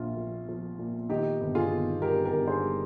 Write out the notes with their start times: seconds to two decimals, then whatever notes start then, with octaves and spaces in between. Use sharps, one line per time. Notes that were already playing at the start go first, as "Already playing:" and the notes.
Already playing: A#1 A#2 F4
0.17 F3
0.49 F3
0.79 A#2
1.09 D#3 D#4 G4
1.41 G1
1.55 F4 G#4
1.71 D#3
2.01 G3 G4 A#4
2.25 G4 A#4
2.33 G1
2.47 G#4 C5
2.63 G3